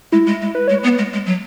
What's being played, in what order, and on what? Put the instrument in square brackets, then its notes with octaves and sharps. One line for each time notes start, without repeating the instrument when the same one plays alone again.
[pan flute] G#3 [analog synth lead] E4
[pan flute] G#3
G#3
[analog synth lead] B4
[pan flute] G#3 [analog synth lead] C#5
[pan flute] B3 [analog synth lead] B4
[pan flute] G#3
G#3
F#3